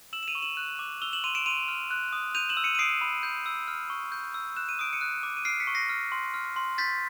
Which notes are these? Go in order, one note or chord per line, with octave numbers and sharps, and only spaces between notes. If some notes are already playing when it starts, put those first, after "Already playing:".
E6 E7 F#7
E7
D#7 F7
C#6
E7 F#7
F#6
D6
E6 F7 G7
E7 F#7
C6 D#7 F7
D7 E7
C6 D#7 F7
F6
F#6
D#6
G6 D#7 F7
E7 F#7
E6
C#7 D#7
D#7
D#6 C7 D7
B5
G6
E6
F6
C#6
G6
E6
F#6 E7
D#7
D#6 D7
C#7 D#7
F#6
D6
D#7
F6 C7 D7
B6 C#7
C#6
A#6 C7
F6
C6
F6
C6
G6 A6 B6